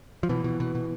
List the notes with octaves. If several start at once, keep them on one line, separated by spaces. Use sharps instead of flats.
F3
B2 E3
B2
B2
B2